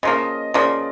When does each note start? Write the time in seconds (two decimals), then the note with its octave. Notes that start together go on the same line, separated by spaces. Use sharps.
0.03 C#3 F3 A#3 D#5
0.54 C#3 F3 A#3 D5